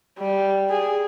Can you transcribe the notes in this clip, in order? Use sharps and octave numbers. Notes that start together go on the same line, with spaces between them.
G3
G#4